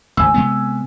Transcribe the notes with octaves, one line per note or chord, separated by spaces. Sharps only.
G#1 D2 G#5 E6
C3 G#3 B3